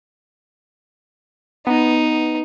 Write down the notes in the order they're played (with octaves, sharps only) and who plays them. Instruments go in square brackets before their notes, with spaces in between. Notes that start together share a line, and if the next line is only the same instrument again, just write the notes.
[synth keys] B3 [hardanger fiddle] D#4